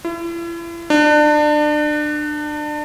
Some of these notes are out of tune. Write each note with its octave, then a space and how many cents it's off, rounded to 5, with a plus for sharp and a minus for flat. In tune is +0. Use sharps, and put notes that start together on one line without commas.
E4 +40
D4 +30